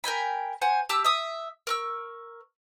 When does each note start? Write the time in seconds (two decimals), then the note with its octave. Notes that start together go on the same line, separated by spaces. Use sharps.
0.04 A#4 G5 G#5 B5
0.62 C5 F#5 G#5
0.89 G4 A5 D6 E6
1.05 E5 D#6
1.67 A#4 C#6 E6